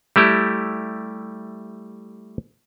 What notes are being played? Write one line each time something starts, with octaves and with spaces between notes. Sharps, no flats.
G3 A3 E4 G4